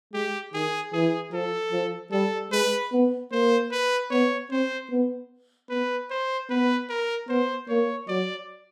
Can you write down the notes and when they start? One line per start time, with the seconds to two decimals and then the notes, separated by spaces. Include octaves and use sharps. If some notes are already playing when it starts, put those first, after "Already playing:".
0.13 G#3 G4
0.53 D#3 G#4
0.93 E3 G#4
1.32 F3 A4
1.72 F3
2.12 G3 A4
2.52 G#3 B4
2.92 B3
3.32 A#3 C5
3.71 B4
4.11 B3 C#5
4.51 C4 C5
4.90 B3
5.69 B3 B4
6.10 C5
6.50 B3 B4
6.89 A#4
7.29 B3 C5
7.69 A#3 C#5
8.08 F#3 D5